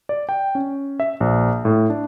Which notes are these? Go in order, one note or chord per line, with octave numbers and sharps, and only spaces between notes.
D5
G5
C#4
E5
A#1
A2
D4